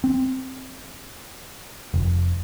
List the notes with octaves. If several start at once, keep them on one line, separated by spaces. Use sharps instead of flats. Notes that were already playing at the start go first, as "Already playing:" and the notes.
C4
F1